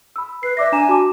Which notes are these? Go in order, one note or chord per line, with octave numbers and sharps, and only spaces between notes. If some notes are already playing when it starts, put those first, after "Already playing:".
B5 E6
B4 C7
D5 E5 D6 A#6
D4 G#5 A#5 E7
F#4 A5 D6